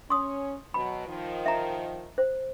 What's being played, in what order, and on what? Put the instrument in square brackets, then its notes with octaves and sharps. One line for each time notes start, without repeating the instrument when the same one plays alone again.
[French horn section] C#4 [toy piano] C6 D#6
[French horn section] B2 F#3 [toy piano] B5
[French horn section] D#3 F3
[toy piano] E5 A#5
C5